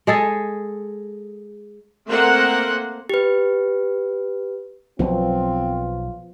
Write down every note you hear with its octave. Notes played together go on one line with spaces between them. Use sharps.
G#3 G#4 A4
A3 A#3 C4 A#4 C5 F#5
G4 B4
B1 B2 F3 F#3 B3 C4 F4